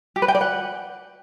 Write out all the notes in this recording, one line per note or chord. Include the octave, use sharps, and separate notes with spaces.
G4
B4
G5
D5
F#5